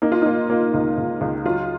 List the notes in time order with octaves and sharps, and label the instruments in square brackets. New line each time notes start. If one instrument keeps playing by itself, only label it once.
[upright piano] A#3 [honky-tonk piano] D#4
[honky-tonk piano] F4
[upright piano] A#3 [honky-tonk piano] D#4
[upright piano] A#3
C#2
C#2
C#2
[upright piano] F#3 [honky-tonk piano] F4